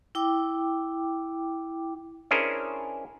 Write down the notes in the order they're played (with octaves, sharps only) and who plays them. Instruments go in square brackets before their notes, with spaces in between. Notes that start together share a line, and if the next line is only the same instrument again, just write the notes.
[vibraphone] E4 G5 D6
[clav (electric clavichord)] C#4 D4 E4 G#4 A#4 C5